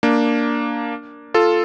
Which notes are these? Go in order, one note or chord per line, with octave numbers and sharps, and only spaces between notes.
A#3 D4
F4 A4